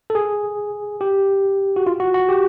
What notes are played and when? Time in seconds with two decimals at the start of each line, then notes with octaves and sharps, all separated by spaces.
0.10 A4
0.15 G#4
1.01 G4
1.76 F#4
1.86 F4
2.00 F#4
2.14 F#4
2.29 G4